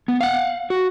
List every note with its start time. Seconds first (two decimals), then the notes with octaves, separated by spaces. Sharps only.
0.08 B3
0.21 F5 F#5
0.70 F#4